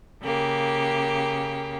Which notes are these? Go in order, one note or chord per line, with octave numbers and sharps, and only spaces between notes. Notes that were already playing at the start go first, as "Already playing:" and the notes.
C#3 A#3 G4